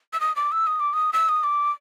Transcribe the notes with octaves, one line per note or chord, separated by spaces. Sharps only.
E6
D#6
D6
E6
D#6
D6
D#6
E6
D#6
D6